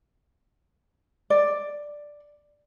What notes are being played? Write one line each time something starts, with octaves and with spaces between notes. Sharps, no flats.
D5